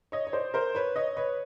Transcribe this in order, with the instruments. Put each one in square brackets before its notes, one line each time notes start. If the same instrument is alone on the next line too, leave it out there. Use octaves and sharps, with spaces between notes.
[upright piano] C#5 D#5
C#5
C5 D5
A#4 C5
B4 C#5
C#5 D#5
B4 C#5